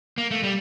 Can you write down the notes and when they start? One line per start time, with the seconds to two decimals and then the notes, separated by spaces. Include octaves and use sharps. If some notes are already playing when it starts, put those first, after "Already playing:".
0.18 A#3
0.31 A3
0.43 G3